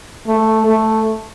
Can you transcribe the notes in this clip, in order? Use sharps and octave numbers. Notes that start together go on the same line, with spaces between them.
A3
A3